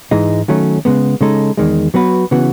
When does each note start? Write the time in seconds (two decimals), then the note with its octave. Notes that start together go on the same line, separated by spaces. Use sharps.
0.11 G#2 E3 G#3 D#4
0.48 D#3 F#3 A3 C#4
0.85 C#3 G#3 B3
1.21 C#3 G#3 D#4 A4
1.57 E2 D#3 G#3
1.94 F#3 B3 F#4 B4
2.31 C#3 E3 B3 F#4